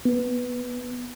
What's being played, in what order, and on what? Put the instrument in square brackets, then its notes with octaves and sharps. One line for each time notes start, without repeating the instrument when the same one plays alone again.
[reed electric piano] B3